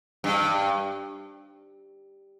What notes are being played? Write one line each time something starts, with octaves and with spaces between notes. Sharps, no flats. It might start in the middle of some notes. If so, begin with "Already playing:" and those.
G2